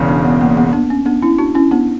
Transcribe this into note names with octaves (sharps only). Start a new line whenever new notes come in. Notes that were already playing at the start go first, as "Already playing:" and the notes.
Already playing: E1 E2 C#3
B3 D4
B3
A#3
B3
B3 D4
C#4
B3 D4
C#4 E4
D4 F#4
C#4 E4
B3 D4